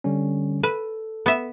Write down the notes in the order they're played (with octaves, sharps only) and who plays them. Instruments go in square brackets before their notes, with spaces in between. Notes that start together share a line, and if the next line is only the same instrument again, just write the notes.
[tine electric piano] D3 G3 C#4
[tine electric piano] A4 [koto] B4
[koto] B3 E5